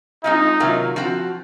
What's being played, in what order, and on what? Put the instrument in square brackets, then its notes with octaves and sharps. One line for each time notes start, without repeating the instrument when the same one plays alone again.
[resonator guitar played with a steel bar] G#3 C4 F4 [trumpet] D#4
[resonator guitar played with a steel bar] C3 D#3 F#3 A#3 F4
F3 C4 F#4